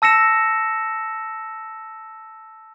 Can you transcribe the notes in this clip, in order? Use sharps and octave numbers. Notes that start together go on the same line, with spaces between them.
A5 E6 A#6 C#7 E7